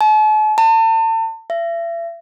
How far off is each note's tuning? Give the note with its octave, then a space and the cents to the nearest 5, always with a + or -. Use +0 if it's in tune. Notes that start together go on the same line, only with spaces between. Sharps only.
A5 -45
A5 +35
E5 +40